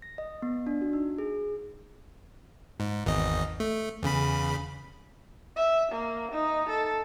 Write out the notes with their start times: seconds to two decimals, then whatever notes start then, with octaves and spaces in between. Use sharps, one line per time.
0.02 A#6
0.18 D#5
0.42 B3
0.67 D4
0.81 F#4
0.93 D#4
1.18 G#4
2.80 G#2
3.06 G#1 E2 D#5
3.60 A3
4.03 E2 C#3 B5
5.56 E5
5.92 A#3
6.32 D#4
6.69 A4